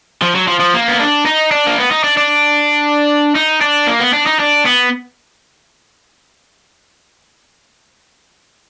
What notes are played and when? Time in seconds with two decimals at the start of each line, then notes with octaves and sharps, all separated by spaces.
0.22 F3
0.35 F#3
0.47 F3
0.60 F3
0.74 A#3
0.88 B3
1.00 D4
1.26 D#4
1.51 D4
1.67 A#3
1.78 B3
1.91 D#4
2.04 D4
2.17 D4
3.35 D#4
3.61 D4
3.87 A#3
4.00 B3
4.13 D4
4.26 D#4
4.39 D4
4.65 B3